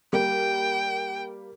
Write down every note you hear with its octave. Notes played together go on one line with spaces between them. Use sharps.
G3 A#3 G5